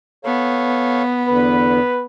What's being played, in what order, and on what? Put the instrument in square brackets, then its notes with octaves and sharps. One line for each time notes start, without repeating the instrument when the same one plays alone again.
[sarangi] B3 [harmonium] A4 C#5 F5
[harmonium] E2 D3 [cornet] B4